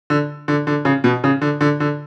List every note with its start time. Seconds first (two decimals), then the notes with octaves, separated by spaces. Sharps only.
0.10 D3
0.48 D3
0.67 D3
0.85 C#3
1.04 B2
1.24 C#3
1.42 D3
1.61 D3
1.80 D3